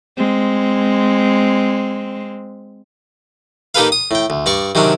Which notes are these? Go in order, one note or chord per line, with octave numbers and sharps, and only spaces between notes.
G#3 C4
A#3 D#4 G4 A4 B4 F5
D#6
A2 G5
D2
G2 D5 C#6
C3 D#3 F#3 C#4 D4